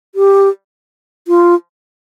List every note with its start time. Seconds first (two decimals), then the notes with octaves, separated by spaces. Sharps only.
0.15 G4
1.28 F4